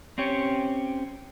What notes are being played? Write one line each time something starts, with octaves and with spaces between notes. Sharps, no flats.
C4 C#4 G4 C#5